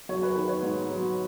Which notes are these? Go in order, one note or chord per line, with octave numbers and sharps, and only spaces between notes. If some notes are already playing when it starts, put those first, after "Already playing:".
F#3 C#5
B4
D#3 B4
C#5
G#2
F#3